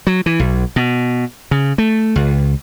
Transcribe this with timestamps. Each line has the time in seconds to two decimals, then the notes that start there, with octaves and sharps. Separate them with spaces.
0.07 F#3
0.26 E3
0.40 B1
0.76 B2
1.51 C#3
1.78 A3
2.16 C#2